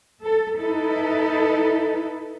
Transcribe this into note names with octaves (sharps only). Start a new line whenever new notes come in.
A4
D#4 E4 A4 B4